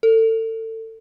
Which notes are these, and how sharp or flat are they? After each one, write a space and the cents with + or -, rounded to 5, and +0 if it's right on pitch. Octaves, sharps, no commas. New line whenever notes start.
A4 +30